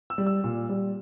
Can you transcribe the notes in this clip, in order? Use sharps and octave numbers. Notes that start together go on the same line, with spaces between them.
E6
G3
E6
A#2
G3